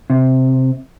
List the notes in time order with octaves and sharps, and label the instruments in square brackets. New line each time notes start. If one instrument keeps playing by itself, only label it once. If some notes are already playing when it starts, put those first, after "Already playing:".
[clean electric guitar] C3